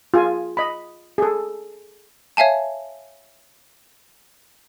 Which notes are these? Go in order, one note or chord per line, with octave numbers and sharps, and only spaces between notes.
F4 G#4 G#5
D#5 B5
G#4 A4
C#5 E5 F5 G#5 A5